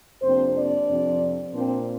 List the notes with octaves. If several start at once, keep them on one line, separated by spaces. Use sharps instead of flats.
F2 C3 A#3 C4 D4 C5
D4 D5
F2 C3 F3 C4
A#2 A#3 C4 D4 C5